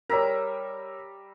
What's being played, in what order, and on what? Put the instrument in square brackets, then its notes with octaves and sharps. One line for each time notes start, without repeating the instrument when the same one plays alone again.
[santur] G3 E5 A#5 [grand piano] A#4 C#5